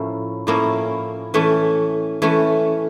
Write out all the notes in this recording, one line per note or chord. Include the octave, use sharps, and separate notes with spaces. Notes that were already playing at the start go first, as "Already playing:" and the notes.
Already playing: A2 F3 A#3 C#4 E4
A2 F3 A#3 C#4 E4
E3 A3 C#4
E3 A3 C#4